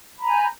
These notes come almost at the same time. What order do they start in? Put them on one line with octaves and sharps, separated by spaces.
B5 A#5 G#5 G6